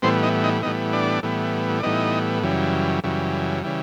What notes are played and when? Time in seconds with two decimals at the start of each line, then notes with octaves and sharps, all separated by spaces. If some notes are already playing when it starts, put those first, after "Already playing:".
0.02 A2 E3 G3 B3 C4 C5
0.23 D#4 D#5
0.44 D#4 D#5
0.63 A2 E3 G3 B3 D#4 D#5
0.93 D4 D5
1.23 A2 E3 G3 B3
1.80 D5
1.83 A2 E3 G3 B3 D#4 D#5
2.43 F#2 C#3 E3 G3
3.03 F#2 C#3 E3 G3
3.63 C#3 E3 G3